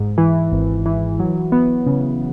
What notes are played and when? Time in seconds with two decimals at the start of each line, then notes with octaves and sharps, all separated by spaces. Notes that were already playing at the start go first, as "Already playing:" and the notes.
Already playing: G#2
0.18 E3
0.52 G#1
0.86 E3
1.19 F#3
1.52 B3
1.87 C#3